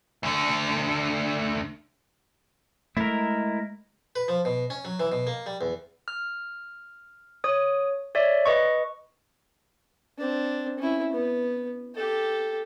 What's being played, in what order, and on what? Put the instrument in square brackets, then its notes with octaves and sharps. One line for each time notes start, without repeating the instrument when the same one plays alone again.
[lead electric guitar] D2 D3
[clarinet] G#3 [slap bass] A3 [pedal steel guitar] E4 A#4
[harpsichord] B4
F3
B2
C#4
F#3
E3
B2
A#3
G3
E2
[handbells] F6
C#5 D#6
C#5 D5 E5
B4 D#5 C#6
[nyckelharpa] C4 D4
C#4 E4
B3
G4 A4